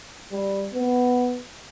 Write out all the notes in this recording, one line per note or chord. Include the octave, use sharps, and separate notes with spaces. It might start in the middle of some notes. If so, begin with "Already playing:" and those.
G3
B3